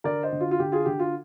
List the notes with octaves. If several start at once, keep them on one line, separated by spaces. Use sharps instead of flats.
D3 A#4 D5
C5 D#5
D3
F4
F4
D3 G4
F4 G#4
D3 G4
F4